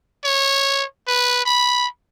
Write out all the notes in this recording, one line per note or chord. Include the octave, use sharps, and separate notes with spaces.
C#5
B4
B5